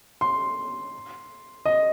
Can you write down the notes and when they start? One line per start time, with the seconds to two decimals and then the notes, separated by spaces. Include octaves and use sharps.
0.21 C6
1.66 D#5